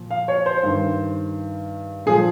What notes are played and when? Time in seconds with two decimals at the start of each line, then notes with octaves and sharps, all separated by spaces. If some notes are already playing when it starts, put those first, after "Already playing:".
Already playing: A#2 F3
0.11 F5
0.28 C#5
0.46 C5
0.63 G2 D#3
2.06 A#2 F3 G#4